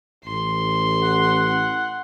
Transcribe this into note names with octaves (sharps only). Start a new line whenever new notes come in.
A1 C6
F#5